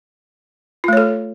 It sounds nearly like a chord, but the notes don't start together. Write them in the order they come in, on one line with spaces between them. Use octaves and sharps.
F4 A3 C#5 A4